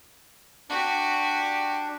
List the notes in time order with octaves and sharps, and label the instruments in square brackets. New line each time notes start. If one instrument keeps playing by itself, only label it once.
[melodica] D4 [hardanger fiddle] F#4 G4